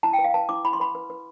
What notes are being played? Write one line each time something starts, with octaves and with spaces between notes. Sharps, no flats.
E4 A5
G5
B4
F5
B4 A5
E4 D6
E4 B5
C6
B4 B5
B4
B4